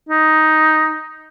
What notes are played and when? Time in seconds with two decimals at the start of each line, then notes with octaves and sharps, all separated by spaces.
0.09 D#4